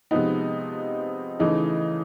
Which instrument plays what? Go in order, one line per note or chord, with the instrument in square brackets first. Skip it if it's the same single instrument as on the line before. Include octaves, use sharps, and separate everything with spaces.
[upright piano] C3 F3 G#3 B3 D#4
C#3 E3 A3 D#4